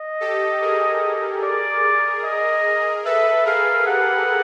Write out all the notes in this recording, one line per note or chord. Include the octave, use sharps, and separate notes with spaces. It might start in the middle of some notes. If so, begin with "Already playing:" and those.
Already playing: D#5
G4 A4
G#4 A#4
G#4 A#4 D5
D#5
A4 B4 E5
G#4 A#4 F5
G4 A4 F#5